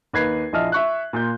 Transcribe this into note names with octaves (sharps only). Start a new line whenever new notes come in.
D#2 B4 G#6 C7
A#1 E4 D#5 A5 F6
E5 C#6 F#6
A#2 F4 G6